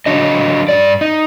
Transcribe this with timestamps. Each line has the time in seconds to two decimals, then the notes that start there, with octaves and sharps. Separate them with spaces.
0.06 F#3 D4 D#5
0.68 G2 E3 D5
1.01 D#4